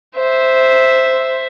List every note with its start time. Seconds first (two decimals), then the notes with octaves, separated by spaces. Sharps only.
0.16 C5 E5